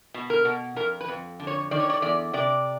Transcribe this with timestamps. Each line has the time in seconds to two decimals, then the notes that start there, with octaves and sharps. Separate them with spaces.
0.14 B2
0.30 A#4
0.45 B2
0.76 F2 A#4
1.01 B4
1.08 F2
1.40 D3
1.47 C#5
1.71 D#3 D5
1.80 C#5
1.90 D5
2.02 E2 D5
2.33 C3 D5